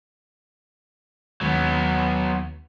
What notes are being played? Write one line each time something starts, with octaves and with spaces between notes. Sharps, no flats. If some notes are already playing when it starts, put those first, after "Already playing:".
D#2 D#3 F#3 G#3 B3